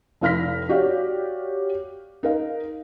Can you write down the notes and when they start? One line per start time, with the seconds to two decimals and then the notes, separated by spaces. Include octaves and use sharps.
0.21 F1 E4 F5 F6 A#6 B6
0.69 F#4 G4 C#5 D5 F5
2.23 D#4 A#4 F5